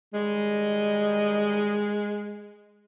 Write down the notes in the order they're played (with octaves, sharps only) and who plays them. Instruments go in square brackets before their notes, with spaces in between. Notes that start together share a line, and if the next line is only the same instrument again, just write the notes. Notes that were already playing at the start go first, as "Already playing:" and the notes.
[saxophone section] D#3 G3 D#5 [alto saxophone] G#3